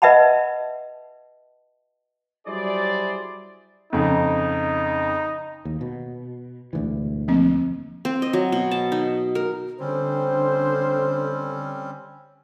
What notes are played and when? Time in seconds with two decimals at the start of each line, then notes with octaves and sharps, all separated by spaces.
0.02 B4 D#5 E5 F#5 A5 B5
2.47 F#3 G3 E4 G#4 C5 D5
3.93 F2 C#3 D#4
5.65 D#2
5.81 B2
6.73 E1 D2 E3
7.28 F3 A#3 C4
8.05 C4
8.22 D#5
8.33 F#3
8.52 B2
8.71 A5
8.92 D#4
9.35 A#4
9.80 D3 G3 C4 C#4 C5